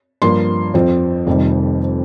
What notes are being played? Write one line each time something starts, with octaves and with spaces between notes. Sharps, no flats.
G2 F3 A#3 C6
F2 F3 C4
F1 F2 C3 D#3 G3